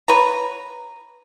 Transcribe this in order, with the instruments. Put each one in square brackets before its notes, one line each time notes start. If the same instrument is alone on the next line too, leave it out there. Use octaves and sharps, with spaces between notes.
[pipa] B4 C#5 A#5